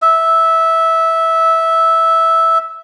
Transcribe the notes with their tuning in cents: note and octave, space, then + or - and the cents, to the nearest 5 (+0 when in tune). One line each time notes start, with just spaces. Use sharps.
E5 -10